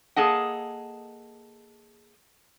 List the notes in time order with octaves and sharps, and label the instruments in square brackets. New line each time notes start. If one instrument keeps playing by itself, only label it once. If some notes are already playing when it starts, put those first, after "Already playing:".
[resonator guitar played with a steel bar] A#3 G#4 A4 D#5 F#5